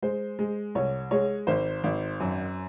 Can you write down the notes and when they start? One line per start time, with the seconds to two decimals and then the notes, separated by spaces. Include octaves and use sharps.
0.02 G#3 C5
0.39 G#3
0.75 C2 C#5
1.11 G#3 C#5
1.47 G#1 C5
1.84 G#1
2.20 F#2